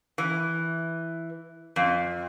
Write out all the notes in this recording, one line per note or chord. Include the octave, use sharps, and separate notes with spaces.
E3
F2